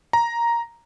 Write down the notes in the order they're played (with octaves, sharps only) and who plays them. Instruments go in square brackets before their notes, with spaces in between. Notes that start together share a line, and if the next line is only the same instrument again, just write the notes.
[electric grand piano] A#5